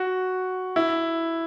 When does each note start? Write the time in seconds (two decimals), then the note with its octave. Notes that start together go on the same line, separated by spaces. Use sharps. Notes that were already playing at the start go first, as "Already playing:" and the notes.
Already playing: F#4
0.76 E4